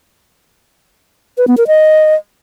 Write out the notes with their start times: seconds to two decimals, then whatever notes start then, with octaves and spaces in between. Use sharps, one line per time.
1.38 B4
1.48 B3
1.57 A#4
1.67 D#5